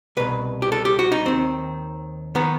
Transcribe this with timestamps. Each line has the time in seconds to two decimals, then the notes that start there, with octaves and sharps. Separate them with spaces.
0.17 C2 B2 B4
0.62 G4
0.72 A4
0.85 G4
0.99 F#4
1.12 D#4
1.25 D#2 D#3 C4
2.35 D#3 B3